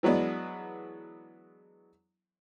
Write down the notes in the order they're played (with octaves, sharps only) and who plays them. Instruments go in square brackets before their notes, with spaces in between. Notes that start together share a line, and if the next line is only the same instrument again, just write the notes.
[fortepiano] E3 F#3 G#3 B3 D4